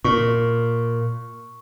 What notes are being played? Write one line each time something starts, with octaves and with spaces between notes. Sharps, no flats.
A#2 C#6